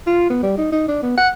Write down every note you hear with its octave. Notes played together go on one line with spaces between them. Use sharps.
F4
B3
G3
D#4
D#4
D4
B3
F#5